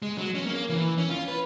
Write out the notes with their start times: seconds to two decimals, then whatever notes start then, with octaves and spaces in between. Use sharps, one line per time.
0.02 G#3
0.18 F#3
0.35 C#4
0.46 A#3
0.69 E3
0.98 C#4
1.10 F4
1.28 B4